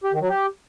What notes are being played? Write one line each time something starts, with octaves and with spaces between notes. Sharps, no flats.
G4
D#3
F#3
G4